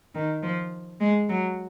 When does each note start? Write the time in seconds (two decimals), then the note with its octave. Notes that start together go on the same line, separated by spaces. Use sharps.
0.15 D#3
0.43 F3
1.00 G#3
1.29 F#3